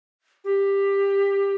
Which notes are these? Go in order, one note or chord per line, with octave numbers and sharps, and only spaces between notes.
G4